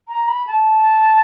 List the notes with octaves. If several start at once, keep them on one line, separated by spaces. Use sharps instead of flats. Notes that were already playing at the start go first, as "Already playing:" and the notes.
A#5
B5
A5